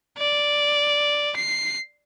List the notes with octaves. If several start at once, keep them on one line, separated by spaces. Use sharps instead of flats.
D5
C7